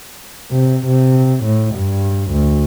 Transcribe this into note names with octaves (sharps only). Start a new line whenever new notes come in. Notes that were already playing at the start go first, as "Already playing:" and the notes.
C3
C3
A2
G2
D2